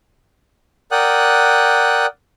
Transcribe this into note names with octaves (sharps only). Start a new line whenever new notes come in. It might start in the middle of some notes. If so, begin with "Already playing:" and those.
A#4 D5 F#5 G5 D#6 F#6